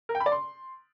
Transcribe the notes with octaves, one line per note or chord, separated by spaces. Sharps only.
A#4
G5
B5
D5
C6